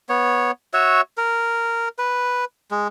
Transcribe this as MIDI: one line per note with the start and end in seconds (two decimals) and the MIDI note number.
0.09 0.51 59
0.09 0.51 73
0.73 1.01 66
0.73 1.01 73
0.73 1.01 76
1.17 1.88 70
1.98 2.45 71
2.71 2.88 56